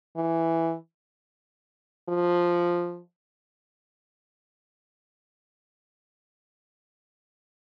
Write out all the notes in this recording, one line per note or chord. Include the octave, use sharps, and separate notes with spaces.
E3
F3